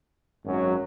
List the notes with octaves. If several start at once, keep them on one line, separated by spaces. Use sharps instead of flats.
G#1 F#2 F#3